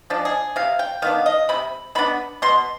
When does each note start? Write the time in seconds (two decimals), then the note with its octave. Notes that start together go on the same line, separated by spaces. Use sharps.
0.10 F3 G#3 D4
0.25 G#4
0.56 C3 F5
0.79 G5
1.02 D#3 B3 D4 F5
1.26 D#5
1.49 C3 B5
1.95 D#3 B3 D4 B5
2.42 B2 C6